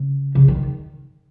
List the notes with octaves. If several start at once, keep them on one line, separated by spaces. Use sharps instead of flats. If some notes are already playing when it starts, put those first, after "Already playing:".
Already playing: C#3
C#3
D#3